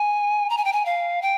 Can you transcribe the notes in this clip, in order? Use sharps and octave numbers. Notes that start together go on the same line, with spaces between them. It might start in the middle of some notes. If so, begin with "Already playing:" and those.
Already playing: G#5
A#5
G#5
G5
G#5
F5
G5